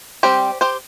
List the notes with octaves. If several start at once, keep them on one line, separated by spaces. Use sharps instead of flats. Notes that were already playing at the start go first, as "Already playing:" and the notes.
G3 C4 G4 C5
G4 C5